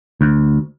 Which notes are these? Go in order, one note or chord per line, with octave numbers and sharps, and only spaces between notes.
D2